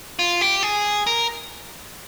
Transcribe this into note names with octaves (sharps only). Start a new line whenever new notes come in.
F4
G4
G#4
A#4